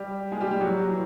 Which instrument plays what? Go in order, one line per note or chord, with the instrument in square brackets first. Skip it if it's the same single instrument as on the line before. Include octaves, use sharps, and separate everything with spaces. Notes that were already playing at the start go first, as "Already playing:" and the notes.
Already playing: [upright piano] G3 G4
G#3 G#4
G3 G4
G3 G4
F#3 F#4
E3